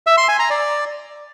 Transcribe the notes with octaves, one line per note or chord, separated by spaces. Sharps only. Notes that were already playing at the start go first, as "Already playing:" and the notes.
E5
C6
G#5
A#5
D5